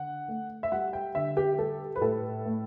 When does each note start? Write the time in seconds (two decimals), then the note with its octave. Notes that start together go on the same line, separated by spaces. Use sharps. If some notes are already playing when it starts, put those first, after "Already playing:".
Already playing: D3 F#5
0.28 A3
0.63 E5
0.72 G3 F#5
0.93 G5
1.15 D3 E5
1.37 G4
1.58 G3 A4
1.96 B4
2.01 A2 A4
2.45 A3